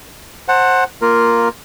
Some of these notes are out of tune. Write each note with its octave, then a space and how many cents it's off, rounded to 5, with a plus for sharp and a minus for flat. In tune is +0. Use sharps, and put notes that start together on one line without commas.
C5 +20 F#5 +0 A5 +30
A#3 +0 F4 +0 A#4 +0